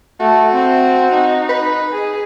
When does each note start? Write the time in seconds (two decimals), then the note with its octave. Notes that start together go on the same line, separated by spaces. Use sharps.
0.20 A3 F#4
0.53 C4
1.12 D#4
1.49 B4
1.92 G#4